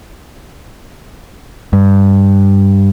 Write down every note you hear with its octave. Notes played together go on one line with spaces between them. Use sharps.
G2